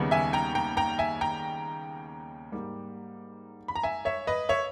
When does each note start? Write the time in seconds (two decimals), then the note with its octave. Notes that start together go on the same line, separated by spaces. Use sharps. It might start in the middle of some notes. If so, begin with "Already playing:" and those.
Already playing: D#2 C#3 G3 B3 D#4
0.11 E5 G#5
0.33 G5 A#5
0.55 G5 A#5
0.77 G5 A#5
0.99 E5 G#5
1.21 G5 A#5
2.52 G#2 G3 A#3
3.68 B5
3.76 A#5
3.83 E5 G#5
4.05 C#5 E5
4.27 B4 D#5
4.49 C#5 E5